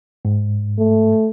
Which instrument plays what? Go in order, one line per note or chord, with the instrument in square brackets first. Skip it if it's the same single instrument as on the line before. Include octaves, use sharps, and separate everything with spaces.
[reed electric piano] G#2
[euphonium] A3